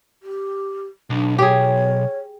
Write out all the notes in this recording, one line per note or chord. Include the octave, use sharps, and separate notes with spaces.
G4
B1 D4
G4 G#4 C#5